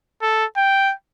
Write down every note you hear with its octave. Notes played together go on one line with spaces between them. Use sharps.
A4
G5